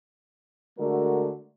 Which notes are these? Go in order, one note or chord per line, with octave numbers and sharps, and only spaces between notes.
D3 G#3 A3 F#4 A#4